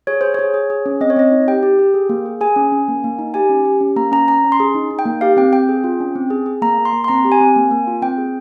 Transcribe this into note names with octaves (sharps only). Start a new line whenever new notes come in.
G#4 C#5
G#4 C5
G#4 C#5
G#4
G#4
C#4
C4 D#5
C#5
C4 D#5
D#4
G4 G5
G4
G4
G#4
A#3
G#4
G#4 G#5
C#4
C#4
A#3
A#3
D#4
G4 G#5
C#4
G4
C#4
A#3 A#5
C#4 A#5
C#4 A#5
C#4
C6
G#4
D#4
D#4
G5
A#3
G4 F5
C4 G5
C4 G5
G#4
F4
C#4
C4
G#4
G#4
A#3 A#5
A#3
C6
A#3
C6
C4 A#5
G4
G#5
C4
A#3
A#3
F4
C4 G5
G#4